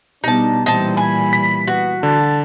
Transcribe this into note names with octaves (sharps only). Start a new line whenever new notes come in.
B2 G3 B3 D4 D#4 A5
A#2 E3 G3 C4 D#4 A5
G#5 B5
B6
B3 F#4
D3 A5